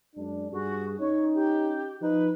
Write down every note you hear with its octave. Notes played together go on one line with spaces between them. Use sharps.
F#2 G#3 D4
G2 F#4 G#4
C#4 D#4 C#5
G4
F3 D#4 B4